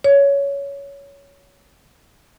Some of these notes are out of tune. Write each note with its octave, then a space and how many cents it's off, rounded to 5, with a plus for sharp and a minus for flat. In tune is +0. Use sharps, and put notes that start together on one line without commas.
C#5 +15